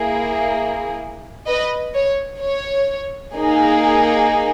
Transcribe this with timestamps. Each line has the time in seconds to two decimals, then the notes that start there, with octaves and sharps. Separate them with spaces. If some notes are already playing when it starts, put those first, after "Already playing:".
Already playing: A#3 E4 G#4
1.48 B4 D#5
1.95 C#5
2.41 C#5
3.35 A#3 D#4 G#4